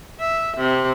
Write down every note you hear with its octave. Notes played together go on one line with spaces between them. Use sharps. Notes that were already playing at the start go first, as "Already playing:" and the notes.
E5
C3